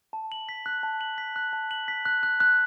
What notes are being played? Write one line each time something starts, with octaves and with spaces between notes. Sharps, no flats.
A5
F#7
B6
F#6
A5
F#7
B6
F#6
A5
F#7
B6
F#6
F#6
F#6